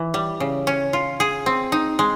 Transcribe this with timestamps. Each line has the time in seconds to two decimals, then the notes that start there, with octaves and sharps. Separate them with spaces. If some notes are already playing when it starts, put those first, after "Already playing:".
Already playing: E3
0.14 G3
0.40 C#3
0.67 C#4
0.93 F4
1.20 G#4
1.46 C4
1.72 D#4
1.99 G#3